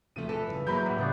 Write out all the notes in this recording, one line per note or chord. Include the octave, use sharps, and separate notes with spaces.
E2 C3 F3 A3 D#7
E2 E3 A4
G2 A#2 C#3
E3 F#3 G#3 A#3 A#5 B5 G6
D1 G3 F#5
A2 C#3 G3 B3 D4 C#5